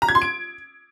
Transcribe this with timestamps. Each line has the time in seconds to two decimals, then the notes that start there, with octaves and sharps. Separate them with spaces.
0.02 A#5
0.09 G#6
0.15 C6
0.22 D7